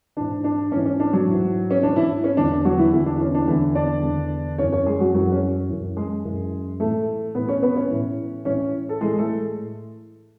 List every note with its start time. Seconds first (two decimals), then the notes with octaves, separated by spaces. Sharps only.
0.17 G#2 E3 D4
0.44 D4
0.72 G#2 E3 C#4
0.86 C#4
1.00 D4
1.13 F#3 F#4
1.28 G#2 E3
1.71 C#4
1.83 G#2 E3 D4
1.96 E3 E4
2.24 C#4
2.37 E2 D3 D4
2.52 D4
2.65 F#3 F#4
2.79 E3 E4
2.93 E2 D3 E3 E4
3.06 D4
3.21 C#4
3.35 D4
3.48 E2 D3 E3 E4
3.75 D4 D5
4.03 E2 D3
4.58 F#2 E3 C#4 C#5
4.72 C#4 C#5
4.86 G#3 G#4
5.00 F#3 F#4
5.14 F#2 E3 F#3 F#4
5.32 C#4
5.69 F#2 E3
5.97 G#3 G#4
6.24 F#2 E3
6.80 A2 E3 A3 A4
7.35 A2 E3 B3 B4
7.49 C#4 C#5
7.62 B3 B4
7.76 C#4 C#5
7.90 A2 E3
8.45 A2 E3 C#4 C#5
8.89 A4
9.00 A2 E3 G#3 G#4
9.19 A3 A4